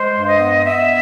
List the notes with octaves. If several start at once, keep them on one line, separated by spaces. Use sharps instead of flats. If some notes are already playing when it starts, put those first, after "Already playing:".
Already playing: G#3 C5
G2
D#5
B3
B3 E5